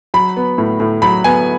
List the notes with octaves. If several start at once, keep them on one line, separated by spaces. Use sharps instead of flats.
F#3 B5
B3
A2
A2
F#3 B5
B3 G#5